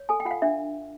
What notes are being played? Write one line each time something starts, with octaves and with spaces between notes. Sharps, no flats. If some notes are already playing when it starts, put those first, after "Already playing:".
Already playing: C#5
A4 G#5
G5
F4 F#5
F5
D4 E5